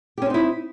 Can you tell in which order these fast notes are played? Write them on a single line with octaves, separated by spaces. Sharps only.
G4 C#4 C4 D#4 E4